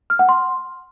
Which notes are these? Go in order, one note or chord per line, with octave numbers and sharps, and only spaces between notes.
F6
F#5
C6